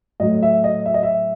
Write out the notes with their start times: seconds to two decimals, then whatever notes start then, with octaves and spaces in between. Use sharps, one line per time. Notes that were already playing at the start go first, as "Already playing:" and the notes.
0.20 A2 F#3 A3 D#5
0.43 E5
0.64 D#5
0.86 E5
0.94 D#5
1.03 E5